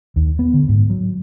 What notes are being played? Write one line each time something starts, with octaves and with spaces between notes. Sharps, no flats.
D#2
B3
D3
G#2
F#3